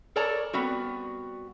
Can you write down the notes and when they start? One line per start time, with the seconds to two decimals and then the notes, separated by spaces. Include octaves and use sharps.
0.16 A4 A#4 C#5 D5 A5 A#5
0.53 G3 B3 C4 F#4